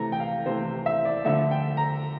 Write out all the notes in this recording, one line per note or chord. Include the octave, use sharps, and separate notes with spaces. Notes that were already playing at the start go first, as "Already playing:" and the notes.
Already playing: C3 E3 A3 A#5
G5
F5
C3 E3 A3 C5
E5
D5
D3 F3 A3 E5
G5
A#5